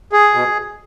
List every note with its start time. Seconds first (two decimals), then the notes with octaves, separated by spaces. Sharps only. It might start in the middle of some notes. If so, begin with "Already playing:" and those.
0.13 G#4
0.34 B2